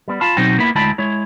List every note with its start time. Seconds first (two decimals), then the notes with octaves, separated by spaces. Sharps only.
0.08 G3 B3
0.21 F4 F5 A5 B5
0.37 B2 F#3 C4 D#4 F#4 G5
0.58 A#3 B3 E4 B5
0.75 D2 G#3 E4 G5 A5 B5
0.98 G#3 E4 C#5